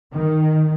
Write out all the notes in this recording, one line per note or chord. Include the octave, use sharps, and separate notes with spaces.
D#3